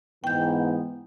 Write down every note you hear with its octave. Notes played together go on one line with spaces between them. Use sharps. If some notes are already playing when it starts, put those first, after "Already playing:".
G#2 E3 B3 G5 G6